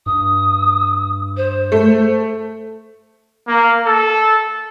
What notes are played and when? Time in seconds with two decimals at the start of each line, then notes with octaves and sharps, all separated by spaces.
0.06 G2 D#6
1.37 C5
1.72 A3
3.48 A#3
3.86 A4